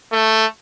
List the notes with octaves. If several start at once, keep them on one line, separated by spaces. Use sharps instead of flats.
A3